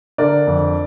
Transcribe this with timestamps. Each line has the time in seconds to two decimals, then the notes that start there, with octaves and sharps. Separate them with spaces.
0.18 D3 A#4 D5
0.47 F2